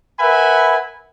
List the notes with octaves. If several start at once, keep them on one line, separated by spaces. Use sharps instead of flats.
A#4 B4 E5 F#5 G#5 B5